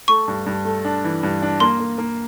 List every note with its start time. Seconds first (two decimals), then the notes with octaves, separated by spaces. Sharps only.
0.08 A3 C#6
0.28 G2
0.46 G2
0.65 A3
0.85 D4
1.04 E3
1.23 G2
1.42 D4
1.60 A#3 C6
1.80 A#3
1.98 A#3